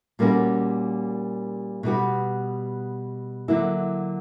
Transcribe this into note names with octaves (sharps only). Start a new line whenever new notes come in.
A#2 G3 A#3 C#4 F#4
B2 G3 B3 F#4
D3 F#3 A#3 E4